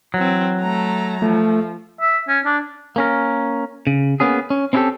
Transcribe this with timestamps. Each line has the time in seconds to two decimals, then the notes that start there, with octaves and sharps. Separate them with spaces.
0.14 E3 F#3 C4
0.61 A3 A#5
1.22 F3 A3
2.01 E5
2.28 C#4
2.45 D4
2.96 A#3 C#4 A#4
3.87 C#3
4.20 A#3 B3 C#4 G#4
4.50 C#4
4.73 C4 C#4 E4 F#4 G4 A4